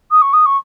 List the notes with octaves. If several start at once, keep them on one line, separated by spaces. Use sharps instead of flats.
D#6
C#6
D#6
C#6